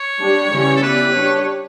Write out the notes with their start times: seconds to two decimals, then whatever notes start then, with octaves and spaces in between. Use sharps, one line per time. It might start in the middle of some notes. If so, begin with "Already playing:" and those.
Already playing: C#5
0.21 G3 D4 G4
0.53 C#3 E3 G3 C#4 G4
0.76 A4
0.83 B3 E4 G4 B4 D5
1.14 G3 D4 G4 C#5